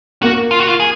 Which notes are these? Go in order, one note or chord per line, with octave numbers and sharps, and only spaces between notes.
A#3 F#4
F4
F#4
F4
G#4